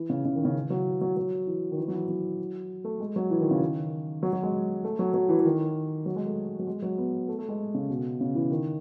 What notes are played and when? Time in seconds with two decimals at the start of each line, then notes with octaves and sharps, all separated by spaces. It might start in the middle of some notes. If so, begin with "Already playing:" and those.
Already playing: E3
0.09 C#3
0.25 C#3
0.35 D#3
0.45 C#3
0.55 E3
0.70 F#3
1.01 F#3
1.17 F#3
1.47 E3
1.72 D#3
1.78 E3
1.88 F#3
1.93 E3
2.09 F#3
2.84 A3
3.00 G#3
3.16 F#3
3.30 E3
3.41 D#3
3.51 C#3
3.61 D#3
4.23 F#3
4.33 F#3
4.43 G#3
4.84 A3
4.99 F#3
5.14 F#3
5.29 E3
5.39 E3
5.45 D#3
6.06 F#3
6.16 G#3
6.26 A3
6.59 F#3
6.67 G#3
6.82 F#3
6.98 B3
7.28 A3
7.38 A3
7.49 G#3
7.74 C#3
7.89 B2
8.20 C#3
8.35 E3
8.50 D#3